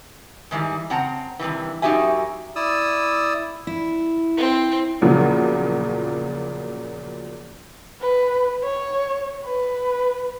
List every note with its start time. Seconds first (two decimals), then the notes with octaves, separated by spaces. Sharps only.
0.51 G#2 D#3 E3 G3
0.90 C#3 C4 F#5 A5 A#5
1.39 G2 C3 D#3 E3
1.82 F#2 D#4 F#4 G4 E5 G#5
2.56 E4 D5 D#6 E6
3.67 E4
4.37 C4
5.01 E2 A#2 C#3 F3 F#3
8.01 B4
8.63 C#5
9.45 B4